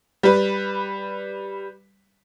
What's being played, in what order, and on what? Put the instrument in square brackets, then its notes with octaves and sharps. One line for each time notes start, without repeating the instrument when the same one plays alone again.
[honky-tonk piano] G3 B4